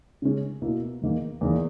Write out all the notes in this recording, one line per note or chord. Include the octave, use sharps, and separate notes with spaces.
C#3 G#3 C#4 G#4
B2 A#3 E4 A#4
E2 D#3 A#3
E2 D#3 A#3